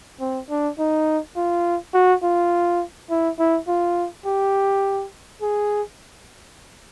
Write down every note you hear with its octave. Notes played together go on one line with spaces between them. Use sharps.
C4
D4
D#4
F4
F#4
F4
E4
E4
F4
G4
G#4